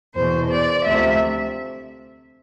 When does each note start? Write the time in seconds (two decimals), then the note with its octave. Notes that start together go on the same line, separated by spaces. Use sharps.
0.15 E2 B2 C5
0.50 D5
0.85 D2 C3 F3 E5